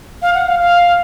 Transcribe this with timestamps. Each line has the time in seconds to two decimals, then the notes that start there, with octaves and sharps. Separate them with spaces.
0.22 F5
0.34 F#5
0.46 F5
0.60 F5